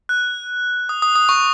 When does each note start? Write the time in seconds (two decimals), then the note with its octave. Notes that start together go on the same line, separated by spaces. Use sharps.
0.09 F#6
0.89 D#6
1.02 D#6
1.16 D#6
1.29 C#6